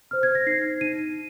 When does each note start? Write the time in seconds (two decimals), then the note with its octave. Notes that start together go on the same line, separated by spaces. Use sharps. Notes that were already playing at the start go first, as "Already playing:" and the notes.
0.11 C5 F6
0.23 G#6
0.35 A#6
0.46 D#4 C7
0.81 D#4 D#7